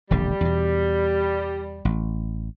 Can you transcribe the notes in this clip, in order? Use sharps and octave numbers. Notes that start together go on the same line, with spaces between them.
E1 A#1 D3 G3
E2 B2
A1